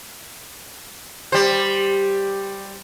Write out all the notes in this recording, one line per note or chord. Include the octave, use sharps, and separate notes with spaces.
G3 C5